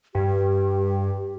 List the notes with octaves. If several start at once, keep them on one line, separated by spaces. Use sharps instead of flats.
G2 G4